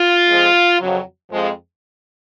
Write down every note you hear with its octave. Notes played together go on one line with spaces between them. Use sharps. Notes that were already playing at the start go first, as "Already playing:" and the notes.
Already playing: F4
F2 F3 G#3
F2 C#3 F#3
F2 F3 G#3